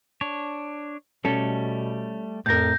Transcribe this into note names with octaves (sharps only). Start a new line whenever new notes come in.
D4 C#5
B2 G3 A3 C#4 A4
F2 A2 A#4 G6 A#6